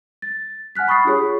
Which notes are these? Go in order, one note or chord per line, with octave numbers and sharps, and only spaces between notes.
A6
F#5 G#5 F6 F#6 B6
B5 C#6 D#6 A6 C7
D4 F4 G4 G#4 C#5